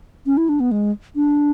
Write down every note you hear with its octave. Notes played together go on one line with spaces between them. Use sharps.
C#4
E4
D4
B3
G#3
D4